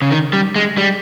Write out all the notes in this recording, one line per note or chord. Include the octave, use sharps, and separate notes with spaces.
C#3
D#3
G3
G#3
G3